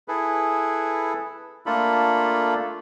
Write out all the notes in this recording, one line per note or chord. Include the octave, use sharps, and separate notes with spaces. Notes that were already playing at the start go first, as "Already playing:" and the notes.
E4 G#4 A4 B4
A3 A#3 D4 F4 A4 B5